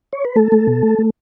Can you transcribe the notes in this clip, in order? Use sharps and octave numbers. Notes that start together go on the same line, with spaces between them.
C#5
B4
A3 A4
A3
B2
A3
A3